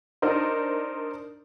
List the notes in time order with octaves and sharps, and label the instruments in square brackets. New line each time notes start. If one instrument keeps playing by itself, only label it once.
[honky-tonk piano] D4 D#4 A#4 C5